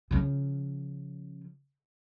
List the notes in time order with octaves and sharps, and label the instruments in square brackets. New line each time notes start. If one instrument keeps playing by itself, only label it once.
[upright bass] C#3 F3